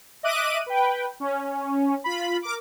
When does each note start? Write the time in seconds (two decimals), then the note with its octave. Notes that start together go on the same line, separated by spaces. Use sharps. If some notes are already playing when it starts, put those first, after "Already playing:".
0.23 D#5 E5 D6 F#6 D#7
0.66 B4 G5
1.20 C#4
2.04 F4 B5
2.42 A#4 D6